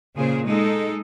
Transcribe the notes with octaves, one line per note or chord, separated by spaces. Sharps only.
A#2 C#3 G#4 C5
G#3 D#4 A4